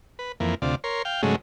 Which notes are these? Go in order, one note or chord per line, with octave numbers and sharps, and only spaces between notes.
B4
F2 E3 A#3
D2 C3 F4 D5
A#4 C#5 C6
F5 G5
G#2 C#3 F#3 G#3 A3